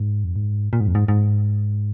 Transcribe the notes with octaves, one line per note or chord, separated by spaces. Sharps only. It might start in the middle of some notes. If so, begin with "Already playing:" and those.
Already playing: G#2
F2
G#2
A#2
G#2
F2
G#2
G#2